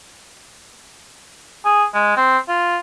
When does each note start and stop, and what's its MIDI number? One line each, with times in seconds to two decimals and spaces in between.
1.65 1.84 68
1.94 2.12 56
2.16 2.38 60
2.48 2.78 65